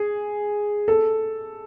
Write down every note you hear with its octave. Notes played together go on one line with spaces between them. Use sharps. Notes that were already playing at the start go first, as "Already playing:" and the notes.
Already playing: G#4
A4